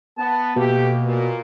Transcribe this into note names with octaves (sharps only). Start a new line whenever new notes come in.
B3 A5
B2 A3 A#3 G4
A#2